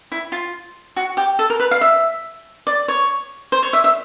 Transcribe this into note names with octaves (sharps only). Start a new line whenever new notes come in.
E4
F4
F#4
G4
A4
A#4
B4
F5
E5
D5
C#5
C5
C#5
E5
E5